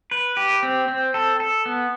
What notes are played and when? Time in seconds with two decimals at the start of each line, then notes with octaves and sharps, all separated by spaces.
0.11 B4
0.37 G4
0.63 C4
0.88 C4
1.14 A4
1.40 A4
1.66 B3